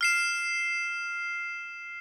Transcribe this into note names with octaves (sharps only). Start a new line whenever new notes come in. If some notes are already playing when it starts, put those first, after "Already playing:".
F6 C7 E7